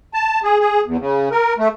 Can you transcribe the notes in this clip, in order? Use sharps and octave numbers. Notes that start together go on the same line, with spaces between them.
A5
G#4
G#4
E2
C#3
A#4
A3